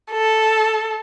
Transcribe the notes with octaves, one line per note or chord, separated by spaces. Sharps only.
A4